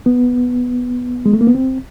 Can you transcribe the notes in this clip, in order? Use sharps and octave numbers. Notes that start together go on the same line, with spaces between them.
B3
G#3
A3
A#3
B3
C4